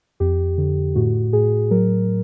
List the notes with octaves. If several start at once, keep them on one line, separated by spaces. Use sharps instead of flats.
F2 G4
D3
A2 F#4
A2 G#4
F#3 A#4